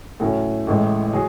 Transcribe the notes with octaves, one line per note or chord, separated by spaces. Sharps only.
A2 F#3 C#4
A1 A2 G#3
F#3 G#4